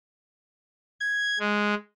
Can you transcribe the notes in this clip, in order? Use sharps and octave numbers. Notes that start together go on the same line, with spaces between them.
G#6
G#3